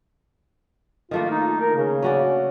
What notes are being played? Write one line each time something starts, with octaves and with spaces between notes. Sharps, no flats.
D#3 A3 A#3 F4
D#4
A#4
C#3
C#4 F#4 D5